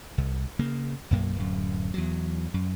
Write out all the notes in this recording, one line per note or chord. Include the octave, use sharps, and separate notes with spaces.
C2
C#3 A#3
B1 F#2 A#3
D1 F#2
E2 F#3
F#2